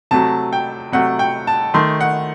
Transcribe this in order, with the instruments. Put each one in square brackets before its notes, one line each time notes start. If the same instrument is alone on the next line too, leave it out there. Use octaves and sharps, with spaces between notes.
[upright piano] C3 F#3 A3 A5
G5
C3 F#3 A3 F#5
G5
A5
D#3 A3 C6
F#5